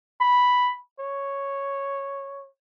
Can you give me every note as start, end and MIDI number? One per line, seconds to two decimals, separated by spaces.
0.21 0.75 83
1.00 2.48 73